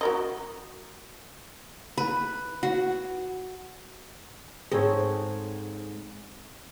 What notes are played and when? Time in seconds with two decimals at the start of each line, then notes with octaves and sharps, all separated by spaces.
0.01 F#4 A#4 D#5
1.98 B4
2.63 F#4
4.72 G#2 C4 G#4 A4 C#5